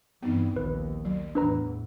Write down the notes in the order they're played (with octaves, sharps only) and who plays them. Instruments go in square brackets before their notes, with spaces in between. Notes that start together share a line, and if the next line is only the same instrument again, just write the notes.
[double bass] G2 E3 [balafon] B3 C4 D#4
[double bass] A#1 D#2 [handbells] B4
[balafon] F#3
[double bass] E2 A2 [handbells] D4 B4 A#5